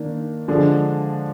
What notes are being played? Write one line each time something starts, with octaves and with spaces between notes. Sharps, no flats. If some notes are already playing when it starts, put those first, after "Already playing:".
Already playing: D#3 A#3 D4
D3 F3 G#3 D4